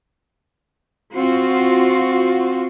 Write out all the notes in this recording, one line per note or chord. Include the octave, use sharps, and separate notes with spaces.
C4 F4 F#4